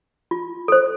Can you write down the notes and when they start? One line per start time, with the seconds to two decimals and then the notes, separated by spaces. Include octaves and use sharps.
0.31 F4
0.68 A4 C5